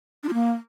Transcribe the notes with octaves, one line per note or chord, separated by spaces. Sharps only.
D4
F4
A#3